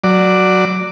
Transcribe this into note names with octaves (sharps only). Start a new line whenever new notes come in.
F#3 D5